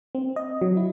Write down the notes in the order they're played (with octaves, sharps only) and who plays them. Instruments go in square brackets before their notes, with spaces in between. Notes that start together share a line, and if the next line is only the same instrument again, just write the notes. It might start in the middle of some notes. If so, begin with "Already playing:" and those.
[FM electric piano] C4
D#5
F#3
E4